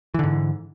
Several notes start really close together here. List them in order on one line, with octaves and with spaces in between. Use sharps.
E3 D3 G#2